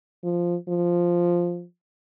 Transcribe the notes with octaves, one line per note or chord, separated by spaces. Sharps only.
F3
F3